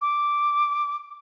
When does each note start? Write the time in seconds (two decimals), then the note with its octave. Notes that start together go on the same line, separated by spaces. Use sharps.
0.02 D6